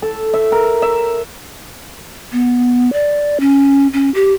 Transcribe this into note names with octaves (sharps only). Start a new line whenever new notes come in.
A4
E5
A#4
E5
B3
D5
C#4
C#4
G4